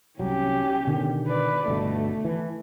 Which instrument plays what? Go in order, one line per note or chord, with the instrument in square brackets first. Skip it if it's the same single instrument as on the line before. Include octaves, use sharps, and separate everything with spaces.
[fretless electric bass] C2 F#3 [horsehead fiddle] C#4 G4
[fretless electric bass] B2 D3 D#3
[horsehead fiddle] B4 D5
[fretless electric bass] G1 B2 D3 [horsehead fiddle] A3
[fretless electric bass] E3